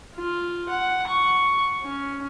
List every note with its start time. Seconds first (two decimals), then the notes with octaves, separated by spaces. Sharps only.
0.15 F4
0.70 F#5
1.08 C#6
1.82 C#4